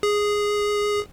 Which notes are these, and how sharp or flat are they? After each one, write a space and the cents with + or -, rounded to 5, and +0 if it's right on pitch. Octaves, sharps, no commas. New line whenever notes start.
G#4 -5